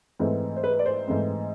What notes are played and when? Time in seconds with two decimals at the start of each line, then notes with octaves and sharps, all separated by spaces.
0.19 G#2 E3 A3 C4
0.57 C5
0.64 B4
0.79 D5
0.86 C5
1.08 G#2 E3 A3 C4